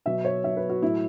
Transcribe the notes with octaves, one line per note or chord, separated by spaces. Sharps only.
B2 F#3 E5
C#5
B2 F#3 E5
B4
F#4
A2 F#3 E4